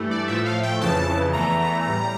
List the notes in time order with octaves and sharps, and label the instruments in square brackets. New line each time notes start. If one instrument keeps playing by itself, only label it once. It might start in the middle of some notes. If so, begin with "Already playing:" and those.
Already playing: [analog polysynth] G2 E3 A3
D5
A2 F3 A3 E5
F5
G5
F2 C#3 E3 A5
E2 E3 A3 A#5
A2 G3